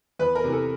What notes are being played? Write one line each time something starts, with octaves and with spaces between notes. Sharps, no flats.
E2 B4
A#4
C3 E3
A4